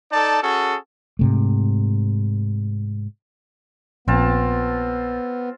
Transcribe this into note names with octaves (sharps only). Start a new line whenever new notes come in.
D#4 A4 D5 A5
C#4 F#4 G#4 A4
G#2 C3 A3
A#1 B3 C4 F4 A5